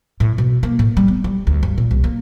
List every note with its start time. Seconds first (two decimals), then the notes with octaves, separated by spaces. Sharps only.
0.20 A2
0.38 B2
0.63 A#3
0.79 A2
0.97 G3
1.08 B3
1.24 G3
1.47 D2
1.63 G2
1.78 A#2
1.91 C2
2.04 A#3